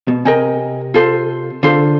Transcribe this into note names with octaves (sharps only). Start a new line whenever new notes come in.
B2
C3 A#4 D#5 G#5
F4 A4 C5
D3 F4 A4 C5